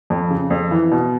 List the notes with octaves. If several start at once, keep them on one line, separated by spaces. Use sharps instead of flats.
F2
C#3
F2
E3
B2